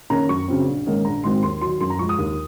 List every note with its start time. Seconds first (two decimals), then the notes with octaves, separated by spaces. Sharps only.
0.10 D#3 A#3 C#4 A#5
0.29 F#2 C#6
0.48 C#3 F#3 C4
0.67 A#1
0.86 G#2 D#3 A#3 C#4
1.05 A#1 A#5
1.24 G#2 D#3 F#3 C4 C6
1.43 D#2 C6
1.61 D#3 F#3 C6
1.81 F#2 C6
1.90 A#5
1.99 F3 G#3 C#6
2.09 D#6
2.18 D#2